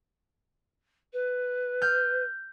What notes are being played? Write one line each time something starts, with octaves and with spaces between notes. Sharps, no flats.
B4
F6 G6